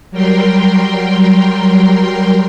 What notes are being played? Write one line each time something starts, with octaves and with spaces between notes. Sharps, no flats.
F#3 G3 A#4 G5 C6